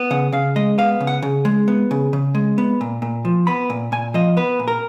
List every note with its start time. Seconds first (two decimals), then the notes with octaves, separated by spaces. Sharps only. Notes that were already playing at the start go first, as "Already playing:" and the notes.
Already playing: B3
0.11 C#3 F#5
0.32 C#3 F5
0.56 G#3 D#5
0.78 B3 F5
1.00 C#3
1.07 F#5
1.22 C#3
1.45 G#3
1.68 B3
1.91 C#3
2.13 C#3
2.35 G#3
2.58 B3
2.81 A#2
3.02 A#2
3.25 F3
3.47 B3 B5
3.70 A#2
3.92 A#2 G#5
4.14 F3 D#5
4.37 B3 B4
4.59 A#2
4.68 A#4